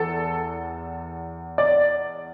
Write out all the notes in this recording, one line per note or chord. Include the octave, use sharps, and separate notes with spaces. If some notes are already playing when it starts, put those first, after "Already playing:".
Already playing: E2 A4
D5